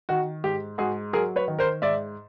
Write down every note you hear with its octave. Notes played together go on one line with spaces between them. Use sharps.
D#3 F#4
G#2 G4
G#2 F#4 G#4
F#3 G#4 A#4
B4 C#5
D#3
A#4 C5
G#2 D5 E5